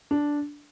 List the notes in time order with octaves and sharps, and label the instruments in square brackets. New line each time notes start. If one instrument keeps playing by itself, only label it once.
[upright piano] D4